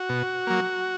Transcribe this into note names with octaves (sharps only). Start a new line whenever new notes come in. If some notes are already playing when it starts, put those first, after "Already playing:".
Already playing: F#4
B2
F#3 A#3